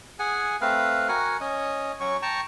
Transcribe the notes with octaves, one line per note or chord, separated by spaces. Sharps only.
G#4 F#5 G#5
A3 C4 B4 F5
F#4 A#4 F#5 G#5
C#4 D#5
F#3 C#4 F#4 C#6
G5 A5 A#5 C#6